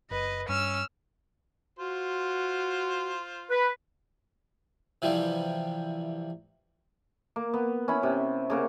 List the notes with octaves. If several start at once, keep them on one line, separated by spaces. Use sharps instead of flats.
F#1 B4 D#5
G2 C#4 E6 F6
F4 F#4 C5
B4
C3 E3 F3 G3
A#3
B3
C#4 E4 B5
C3
C#3 A#3 F#5